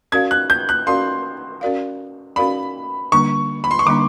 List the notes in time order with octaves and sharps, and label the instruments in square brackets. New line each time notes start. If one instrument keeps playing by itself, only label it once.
[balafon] C#4 F#4 A#4 D5 F5 [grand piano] G#6
[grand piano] F#6
G6
F#6
[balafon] C#4 F#4 A#4 D5 F5 [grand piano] C6
[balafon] C#4 F#4 A#4 D5 F5
[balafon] C#4 F#4 A#4 D5 F5 [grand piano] B5
[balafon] D3 G3 A#3 D4 [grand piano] C#6
[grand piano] B5
C6
C#6
[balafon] D3 G3 A#3 D4 [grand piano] D6